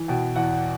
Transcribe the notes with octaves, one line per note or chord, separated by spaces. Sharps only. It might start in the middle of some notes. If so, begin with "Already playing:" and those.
Already playing: E3
B2 G5
E2 F#5